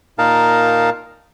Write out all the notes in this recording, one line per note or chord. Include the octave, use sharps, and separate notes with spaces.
A#2 D#4 A#4 F5 A5